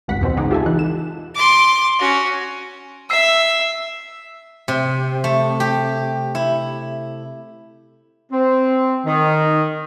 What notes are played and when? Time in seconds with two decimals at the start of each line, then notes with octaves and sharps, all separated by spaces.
0.08 G#1 C#2 G2 F#5 B6
0.21 E2 B2 C4
0.37 C#2 G#3 D#4 F#5 D6
0.51 F4 G4 A4 E5 G#5 A5
0.66 E3 D#4 F#6
0.79 E7
1.34 C6 D6
1.99 C#4 F#4
3.10 E5 E6 C7
4.68 C3
5.24 A3
5.60 G4
6.35 E4
8.31 C4
9.06 D#3